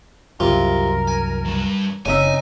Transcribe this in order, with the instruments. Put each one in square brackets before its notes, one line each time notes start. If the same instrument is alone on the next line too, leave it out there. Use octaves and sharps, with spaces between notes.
[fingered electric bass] C2 F#2 [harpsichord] C3 F4 [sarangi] A#4
[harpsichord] G#5
[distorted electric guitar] D2 G2
[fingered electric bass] F#1 C4 [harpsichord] C#3 E5 [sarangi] D#4 [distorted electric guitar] G#5